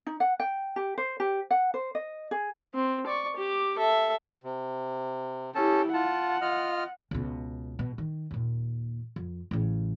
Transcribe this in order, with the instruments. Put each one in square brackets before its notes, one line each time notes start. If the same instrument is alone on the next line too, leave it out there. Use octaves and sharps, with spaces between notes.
[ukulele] D#4
F#5
G5
G4
C5
G4
F#5
C5
D#5
G#4
[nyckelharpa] C4
D5 C#6
G4 D6
A4 E5
[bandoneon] C3
[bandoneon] C#4 A4 A5 [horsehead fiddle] E4 G4
[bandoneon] F4 A5 [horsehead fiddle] F#5
[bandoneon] F4 D#5 F6
[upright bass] C#2 B2
B2
D#3
D#2 A#2
F2
A1 C#3